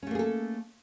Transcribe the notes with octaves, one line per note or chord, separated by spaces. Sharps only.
A3 A#3 C#4 G#4 A4